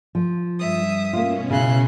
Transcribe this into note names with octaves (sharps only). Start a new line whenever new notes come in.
F3
G2 E5 D#6
B2 A#3 C#4 F4
C#3 E4 C6 F#6